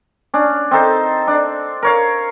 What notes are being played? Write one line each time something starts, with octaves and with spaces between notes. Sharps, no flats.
C#4 D4
C4 D#4 A4 C5
D4
A#4 C#5 F5